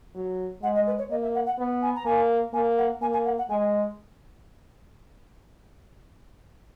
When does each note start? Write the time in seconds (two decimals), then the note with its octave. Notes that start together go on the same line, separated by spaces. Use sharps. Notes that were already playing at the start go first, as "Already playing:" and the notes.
0.15 F#3
0.62 G#3 F#5
0.75 D#5
0.87 B4
0.98 C#5
1.10 A#3 D#5
1.22 E5
1.35 F#5
1.46 F#5
1.58 B3
1.82 G#5
1.96 A#5
2.06 A#3 G#5
2.53 A#3 G#5
2.78 F#5
3.01 A#3 G#5
3.13 G#5
3.25 F#5
3.38 F#5
3.49 G#3 G#5